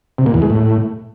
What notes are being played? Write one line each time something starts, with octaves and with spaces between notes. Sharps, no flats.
C3
A#2
E2
G#3
A2